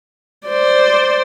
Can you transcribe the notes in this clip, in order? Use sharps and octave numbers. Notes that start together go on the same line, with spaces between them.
C5 D5